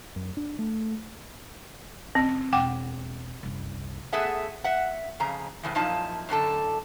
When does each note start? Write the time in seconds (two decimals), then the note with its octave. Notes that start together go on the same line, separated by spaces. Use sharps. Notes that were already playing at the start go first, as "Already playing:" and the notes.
0.16 F#2
0.37 D4
0.59 A3
2.15 F1 C4 C#4
2.53 E1 F#5 G5 D6
3.43 F#1 C2
4.13 A3 B3 G#4 E5 F#5
4.64 E5 F#5
5.20 F2 C#3 A#5
5.63 A2 C#3 E3
5.75 F#2 A#2 F3 D#4 E4 A5
6.29 F#2 A2 D3 A4